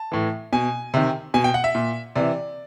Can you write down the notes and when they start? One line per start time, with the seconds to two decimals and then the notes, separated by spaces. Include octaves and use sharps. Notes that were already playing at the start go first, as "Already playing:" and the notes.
Already playing: A5
0.12 A2 E3
0.53 B2 G#5
0.94 C3 D#3
1.34 B2 G#5
1.44 G5
1.54 F#5
1.64 E5
1.75 A#2
2.15 C3 E3 D5